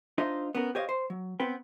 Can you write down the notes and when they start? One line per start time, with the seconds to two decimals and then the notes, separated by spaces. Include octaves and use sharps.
0.18 D4 D#4 F4 C5 D#5 E5
0.55 B3 C#4 A#4
0.75 G4 C5 C#5 D#5 F5
0.89 C5
1.10 F#3
1.40 B3 C4 B4 G5